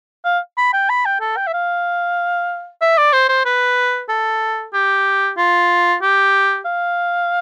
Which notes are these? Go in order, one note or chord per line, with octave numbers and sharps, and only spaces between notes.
F5
B5
G5
B5
G5
A4
G5
E5
F5
E5
D5
C5
C5
B4
A4
G4
F4
G4
F5